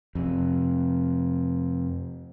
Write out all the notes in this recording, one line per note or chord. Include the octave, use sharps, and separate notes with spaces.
F2 C3